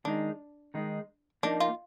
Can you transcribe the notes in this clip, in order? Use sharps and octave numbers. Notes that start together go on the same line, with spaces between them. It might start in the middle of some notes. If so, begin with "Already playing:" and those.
D#3 G#3 D4 D#4
D#3 G#3 D#4
F3 A#3 D4 D#4
F4